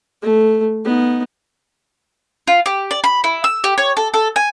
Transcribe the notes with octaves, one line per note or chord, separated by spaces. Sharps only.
A3
B3 D#4
F4
G4
D5
B5
E4
E6
G4
C#5
A4
A4
G#5